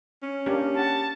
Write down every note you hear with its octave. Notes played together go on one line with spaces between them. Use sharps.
C#4
A#3 D4 G4
G4 F#5 A5